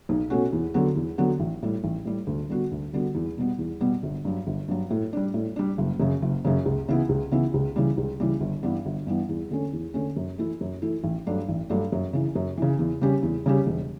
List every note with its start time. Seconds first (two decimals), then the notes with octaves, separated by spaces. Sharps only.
0.09 B1
0.30 B2 A3 C#4 F#4
0.53 E2
0.74 D3 F#3 B3 F#4
0.96 E2
1.18 D3 F#3 B3 F#4
1.40 A1
1.62 A2 G3
1.84 A1
2.05 A2 G3
2.27 D2
2.50 D3 G3 B3 F#4
2.71 D2
2.93 D3 G3 B3 F#4
3.15 E2
3.38 B2 G3 B3
3.59 E2
3.81 B2 G3 B3
4.03 G1
4.25 G2 F#3
4.47 G1
4.68 G2 F#3
4.90 A2
5.13 G3 D4
5.34 A2
5.56 G3 D4
5.78 F#1
6.00 F#2 C#3
6.22 F#1
6.45 F#2 C#3
6.66 C#2
6.88 C#3 E3 B3 E4
7.09 C#2
7.31 C#3 E3 B3 E4
7.54 C#2
7.76 C#3 E3 G3
7.97 C#2
8.20 C#3 E3 G3
8.41 G1
8.63 G2 E3 G3 B3
8.86 G1
9.07 G2 E3 G3 B3
9.29 E2
9.51 D3 A3 C#4
9.73 E2
9.94 D3 A3 C#4
10.17 F#2
10.38 E3 A3 E4
10.61 F#2
10.82 E3 A3 E4
11.04 A1
11.27 G2 F#3 A3 D4
11.48 A1
11.69 G2 F#3 A3 D4
11.92 F#2
12.13 C#3 E3
12.35 F#2
12.57 C#3 E3
12.79 E2
13.01 C#3 G3 C#4 G4
13.23 E2
13.46 C#3 G3 C#4 G4
13.67 E1